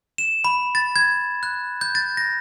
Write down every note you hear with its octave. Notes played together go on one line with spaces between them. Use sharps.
E7
B5
A6
G#6
F#6
G6
A6
A#6